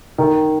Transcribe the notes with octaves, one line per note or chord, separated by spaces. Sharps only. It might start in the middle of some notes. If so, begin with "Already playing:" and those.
D#3